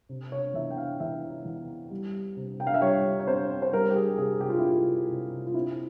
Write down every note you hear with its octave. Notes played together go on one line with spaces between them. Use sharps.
C3
C#5
E2 E5
G5
F5
E2 E5
E2
G3
C3
G5
F5
E5
G3 C#5
C#5
C4 C5
C5
G3 A#4
G4
G#4
C3 G#4
G4
F4
E4
C3 F4
C3
F4
C4 E4